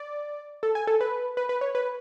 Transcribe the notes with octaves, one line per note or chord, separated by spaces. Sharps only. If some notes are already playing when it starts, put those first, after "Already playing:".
Already playing: D5
A4
G#5
A4
B4
B4
B4
C#5
B4